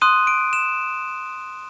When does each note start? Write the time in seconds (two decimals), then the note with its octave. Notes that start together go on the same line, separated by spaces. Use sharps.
0.01 C6 D#6 F#6 D#7
0.27 D7
0.53 E7